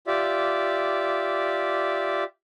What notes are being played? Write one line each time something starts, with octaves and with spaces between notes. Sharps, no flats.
F4 G4 D5 E5